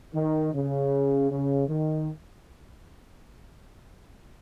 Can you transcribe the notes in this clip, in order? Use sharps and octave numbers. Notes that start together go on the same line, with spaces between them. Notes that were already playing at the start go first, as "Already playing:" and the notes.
D#3
C#3
C#3
D#3